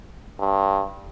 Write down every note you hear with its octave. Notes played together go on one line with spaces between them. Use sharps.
G2